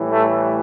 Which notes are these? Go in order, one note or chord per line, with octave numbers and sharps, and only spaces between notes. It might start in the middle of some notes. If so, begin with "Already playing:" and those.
Already playing: A2 E3 G3
A3